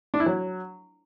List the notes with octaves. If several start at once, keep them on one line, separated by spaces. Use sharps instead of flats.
D4
E4
F#3